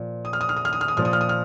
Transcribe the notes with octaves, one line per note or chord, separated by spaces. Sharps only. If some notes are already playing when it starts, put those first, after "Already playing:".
Already playing: A#2 F3
D#6
F6
D#6
F6
D#6
F6
D#6
F6
D#6
A#2 F3 F6
D#6
F6
D#6
F6